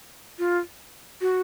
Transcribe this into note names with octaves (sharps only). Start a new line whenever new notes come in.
F4
F#4